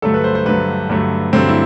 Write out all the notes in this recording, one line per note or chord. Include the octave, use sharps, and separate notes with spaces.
G2 D3 F#3 A3 A4
B4
C5
C5
G2 D3 F#3 A3 B4
G2 D3 F#3 A3
G2 D3 F#3 A3 C4
E4